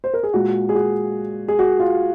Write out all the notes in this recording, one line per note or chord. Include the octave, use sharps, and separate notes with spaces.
C5
A#4
G#4
A#2 G#3 F#4
G#4
F#4
G#4
F#4
F4